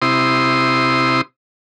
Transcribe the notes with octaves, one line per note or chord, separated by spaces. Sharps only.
C3 E4 C6 D#6